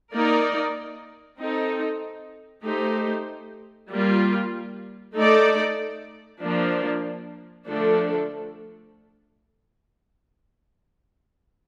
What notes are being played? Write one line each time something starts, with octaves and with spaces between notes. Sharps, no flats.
A#3 D#4 A#4 D5
C4 D#4 A4
A3 D#4 G4 C5
G3 A#3 F4
A3 D#4 A4 D5
F3 A#3 D4
D3 F3 A3 D4 A4